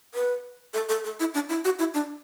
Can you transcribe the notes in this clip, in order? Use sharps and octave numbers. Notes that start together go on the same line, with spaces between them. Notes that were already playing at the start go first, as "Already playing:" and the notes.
B4
A4
A4
A4
E4
D4
E4
F#4
E4
D4